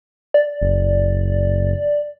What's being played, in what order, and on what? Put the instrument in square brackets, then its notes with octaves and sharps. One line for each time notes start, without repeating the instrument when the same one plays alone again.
[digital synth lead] D5
[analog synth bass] F#1